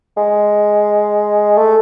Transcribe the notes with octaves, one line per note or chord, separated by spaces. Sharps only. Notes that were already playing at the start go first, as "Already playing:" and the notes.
G#3
A3